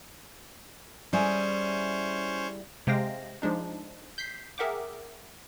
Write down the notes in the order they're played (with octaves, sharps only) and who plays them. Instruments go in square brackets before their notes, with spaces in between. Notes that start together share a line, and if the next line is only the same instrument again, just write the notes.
[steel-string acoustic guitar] G3 E4 G#4 [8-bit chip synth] C#4 C5 C#5
[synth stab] C3 G#3 C5 F5 G5 A#6
F3 G#3 D4 D#4
G6 B6 C7
G#4 A#4 E5 F#5 G5 D6